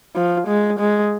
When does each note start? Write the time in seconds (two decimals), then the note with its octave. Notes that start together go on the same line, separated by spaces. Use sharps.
0.15 F3
0.48 G#3
0.80 G#3